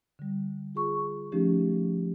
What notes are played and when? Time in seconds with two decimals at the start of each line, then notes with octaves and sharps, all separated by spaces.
0.19 D3 G3
0.75 F4 G#4 C#6
1.32 F3 A3 C#4 D#4 G4